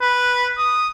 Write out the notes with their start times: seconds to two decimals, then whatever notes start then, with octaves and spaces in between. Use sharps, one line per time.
0.01 B4
0.58 D#6